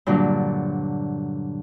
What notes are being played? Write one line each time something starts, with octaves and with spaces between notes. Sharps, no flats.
G2 A#2 D3 F#3